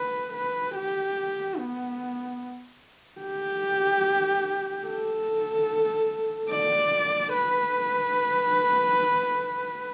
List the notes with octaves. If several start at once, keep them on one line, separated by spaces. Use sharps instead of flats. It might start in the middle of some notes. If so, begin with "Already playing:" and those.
Already playing: B4
B4
G4
B3
G4
A4
D5
B4